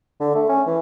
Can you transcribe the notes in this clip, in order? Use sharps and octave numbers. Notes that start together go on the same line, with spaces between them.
D3
A3
C#4
E3